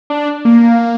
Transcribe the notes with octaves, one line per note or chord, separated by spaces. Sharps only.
D4
A#3